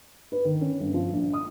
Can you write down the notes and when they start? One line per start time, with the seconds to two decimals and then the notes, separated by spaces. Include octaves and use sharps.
0.32 B4
0.45 D#3
0.61 C#4
0.81 G1
0.94 F3
1.13 A#1
1.33 D#6